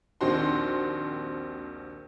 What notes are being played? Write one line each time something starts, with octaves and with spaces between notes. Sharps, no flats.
A#1 D#2 C4 F#4 C6